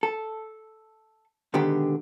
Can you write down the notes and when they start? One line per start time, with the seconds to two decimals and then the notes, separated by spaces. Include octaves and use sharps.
0.03 A4
1.54 B2 D3 D#3 G#3 B3 G4